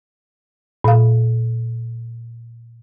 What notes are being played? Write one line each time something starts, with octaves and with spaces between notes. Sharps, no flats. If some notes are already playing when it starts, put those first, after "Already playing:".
A#2 F5